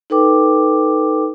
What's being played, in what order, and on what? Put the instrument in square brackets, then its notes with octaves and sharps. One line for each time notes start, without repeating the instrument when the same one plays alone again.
[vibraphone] D#4 A4 B4 G5 D6